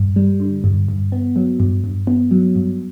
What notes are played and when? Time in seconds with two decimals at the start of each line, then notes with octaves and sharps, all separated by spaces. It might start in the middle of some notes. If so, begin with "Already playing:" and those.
Already playing: G2
0.16 G3
0.40 D3
0.64 G2
0.88 G2
1.12 B3
1.36 F#3
1.60 G2
1.84 G2
2.07 B3
2.31 F#3
2.55 G2